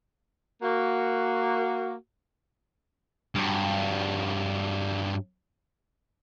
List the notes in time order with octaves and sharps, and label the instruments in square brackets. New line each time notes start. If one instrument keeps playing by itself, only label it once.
[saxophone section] A#3 F#4
[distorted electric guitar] G2 F#3